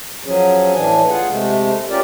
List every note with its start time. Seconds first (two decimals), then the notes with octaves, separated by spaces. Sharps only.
0.25 F3 F#3 C#4 G#4
0.74 A2 E3 D4 G#5
1.09 F4 G#4 F#5
1.28 C3 G#3 A3
1.90 C#4 F4 G4 A#4 D5